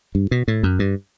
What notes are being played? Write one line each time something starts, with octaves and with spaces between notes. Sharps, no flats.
G2
B2
A2
F#2
G2